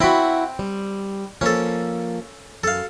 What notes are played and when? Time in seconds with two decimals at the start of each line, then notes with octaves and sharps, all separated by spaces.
0.01 C4 E4 F#4 G5 B5
0.59 G3
1.41 F3 A#3 C#4 A4
2.64 F#2 A4 F5